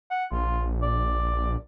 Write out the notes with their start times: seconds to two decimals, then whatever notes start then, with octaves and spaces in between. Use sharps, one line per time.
0.10 F#5
0.31 A#1 F4
0.82 D5